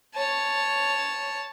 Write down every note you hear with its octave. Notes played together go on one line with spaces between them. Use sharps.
C#5 A5